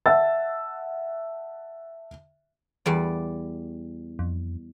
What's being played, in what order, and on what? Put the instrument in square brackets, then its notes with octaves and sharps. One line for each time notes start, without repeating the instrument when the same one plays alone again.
[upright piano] E5 F#5 A5 E6 A6
[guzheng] E2 G3 D5
[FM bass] F2